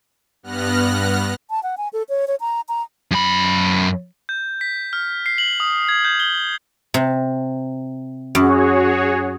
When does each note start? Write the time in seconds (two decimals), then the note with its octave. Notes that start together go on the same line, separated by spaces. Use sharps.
0.43 G2 B3 F6 F#6 A#6
1.50 A5
1.63 F#5
1.78 G#5
1.93 A4
2.09 C#5
2.28 C#5
2.40 A#5
2.69 A#5
3.11 F#2 B5
4.29 G6
4.61 B6
4.93 F6
5.26 C7
5.38 F#7
5.60 D#6
5.89 G#6
6.05 G6
6.20 G7
6.94 C3
8.35 F#2 F#4 G#4 C#5